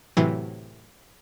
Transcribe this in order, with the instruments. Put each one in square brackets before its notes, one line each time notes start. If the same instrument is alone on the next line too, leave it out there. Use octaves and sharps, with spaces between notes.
[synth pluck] A2 C3 E3 F#3